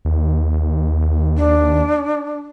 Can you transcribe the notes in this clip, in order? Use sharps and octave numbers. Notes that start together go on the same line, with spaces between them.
D#2
D4